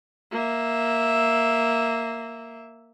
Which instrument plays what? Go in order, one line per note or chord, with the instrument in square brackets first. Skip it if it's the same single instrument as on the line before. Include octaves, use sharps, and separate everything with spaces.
[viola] A#3 E5